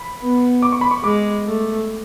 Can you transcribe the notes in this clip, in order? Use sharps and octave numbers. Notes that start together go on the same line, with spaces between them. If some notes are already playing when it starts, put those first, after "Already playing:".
Already playing: B5
B3
D6
C#6
B5
C#6
G#3 D6
A3